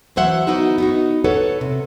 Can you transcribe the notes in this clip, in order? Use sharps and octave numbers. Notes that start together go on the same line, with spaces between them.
E3 F#3 C5 E5 F#5
B3 D#4 E4 F#4
B3 D#4 F#4
A4 B4 C#5 F#5
C3